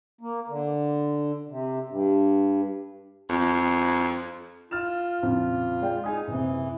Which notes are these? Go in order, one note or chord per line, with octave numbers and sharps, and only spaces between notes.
A#3
D3
C3
G2
F2
F4 F6 A6 E7
F2 A#2 C#3
G#3 D5 G5
D#4 G#4 G#5 D#6
F#1 C3 E3